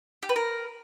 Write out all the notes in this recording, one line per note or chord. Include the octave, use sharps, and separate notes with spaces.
G4
B4
A#4